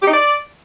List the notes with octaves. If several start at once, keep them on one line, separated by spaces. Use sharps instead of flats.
G4
D#4
D5